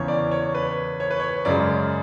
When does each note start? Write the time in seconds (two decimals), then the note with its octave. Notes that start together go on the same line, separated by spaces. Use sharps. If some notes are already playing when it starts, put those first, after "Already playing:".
Already playing: E2 C#3 E3 C#5
0.08 D5
0.31 C#5
0.55 B4
1.00 C#5
1.11 B4
1.20 C#5
1.45 F#2 C#3 G#3 D5